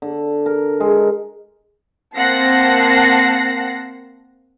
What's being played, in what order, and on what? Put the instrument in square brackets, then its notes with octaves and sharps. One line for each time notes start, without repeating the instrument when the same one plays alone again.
[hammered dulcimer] D3
A#4
G#3
[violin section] A#3 C4 F#5 A5 A#6 C7